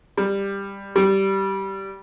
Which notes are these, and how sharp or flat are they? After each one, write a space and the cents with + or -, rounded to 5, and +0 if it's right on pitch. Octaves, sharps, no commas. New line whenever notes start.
G3 +15
G3 -10